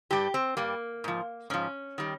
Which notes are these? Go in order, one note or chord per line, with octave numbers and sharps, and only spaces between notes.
G2 G3 G4
C4
G2 G3 A#3
G#2 F3
G#2 F3 C#4
D#3 G3